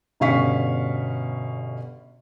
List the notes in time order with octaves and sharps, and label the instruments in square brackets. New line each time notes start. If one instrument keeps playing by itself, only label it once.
[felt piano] G1 B2 C#4 F5 C#6 B6